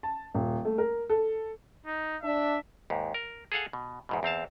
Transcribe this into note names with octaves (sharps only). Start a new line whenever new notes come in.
A5
D#1
A3
A#4
A4
D#4
D4 E5
D#2 G#2
A#4
G#4 A4 F5 F#5 G#5
B2
E2 G#2 B2
E2 C4 F5 A5